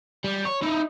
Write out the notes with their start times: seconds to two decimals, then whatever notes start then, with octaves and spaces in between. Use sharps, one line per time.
0.24 G3
0.45 C#5
0.62 D#4 E4